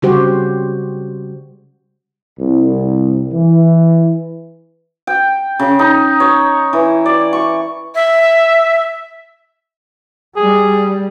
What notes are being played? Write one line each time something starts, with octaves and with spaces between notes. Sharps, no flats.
C#3 G3 F#4 G4 C5
C2
E3
G5
C#3
D#4
C#5
E3
D5
C#6
E5
G3 G#4